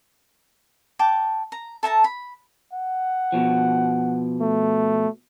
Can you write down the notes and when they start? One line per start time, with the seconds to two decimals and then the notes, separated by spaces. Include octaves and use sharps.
0.99 G5 A5 D6
1.52 A#5
1.83 A4 E5 A5 A#5
2.04 B5
2.73 F#5
3.32 B2 F3
4.41 A3